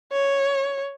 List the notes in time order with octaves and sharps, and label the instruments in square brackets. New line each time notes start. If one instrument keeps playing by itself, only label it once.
[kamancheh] C#5